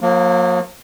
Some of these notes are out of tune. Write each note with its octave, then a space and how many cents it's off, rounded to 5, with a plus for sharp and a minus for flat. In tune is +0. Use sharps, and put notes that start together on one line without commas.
F#3 -45 A#3 +0